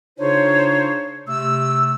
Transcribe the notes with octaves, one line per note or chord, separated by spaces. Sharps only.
C#3 D4 D#4 F4 C5 C#5
C3 A3 E6